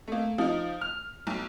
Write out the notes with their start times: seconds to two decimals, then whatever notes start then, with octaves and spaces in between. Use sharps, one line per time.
0.08 A3 A#3
0.38 F3 D#4
0.81 F6
1.27 B1